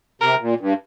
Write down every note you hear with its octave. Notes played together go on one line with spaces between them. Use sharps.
C3 A#4
A#2
G2